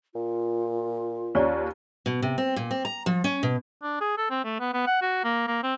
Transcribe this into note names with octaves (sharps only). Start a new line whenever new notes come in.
A#2 F4
D#2 C#4 C#5 D5 A#5
B2
C3
C4
A#2
C4
A#5
F3
C#4
B2
D4
G#4
A4
C4
A3
B3
B3
F#5
F#4
A#3
A#3
C4